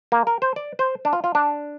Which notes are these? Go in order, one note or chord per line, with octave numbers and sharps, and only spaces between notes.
A#3
A#4
C5
D5
C5
D4
F4
F4
D4